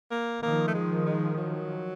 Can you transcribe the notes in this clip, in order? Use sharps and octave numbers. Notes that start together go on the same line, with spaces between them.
A#3
D#3 F3 A#3
A3
G#3
G#3
F#3